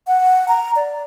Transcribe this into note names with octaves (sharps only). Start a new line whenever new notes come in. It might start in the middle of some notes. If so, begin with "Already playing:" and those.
F#5
A#5
D5